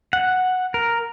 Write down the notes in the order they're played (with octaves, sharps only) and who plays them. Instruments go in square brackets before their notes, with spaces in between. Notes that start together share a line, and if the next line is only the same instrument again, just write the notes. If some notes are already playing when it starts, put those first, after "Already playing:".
[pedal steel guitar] F#5
A#4